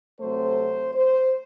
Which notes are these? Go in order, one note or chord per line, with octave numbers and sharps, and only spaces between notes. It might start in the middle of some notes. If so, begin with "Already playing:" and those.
C3 F#3 A3 C4 C5
C5